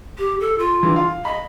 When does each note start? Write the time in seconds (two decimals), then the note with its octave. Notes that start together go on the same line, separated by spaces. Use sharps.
0.18 G4
0.40 A4
0.58 F4
0.83 D3 E3
0.96 F5
1.25 D#5 B5